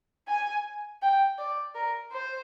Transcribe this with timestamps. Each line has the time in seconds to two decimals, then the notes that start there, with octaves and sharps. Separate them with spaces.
0.28 G#5
1.02 G5
1.38 D5
1.75 A#4
2.12 C5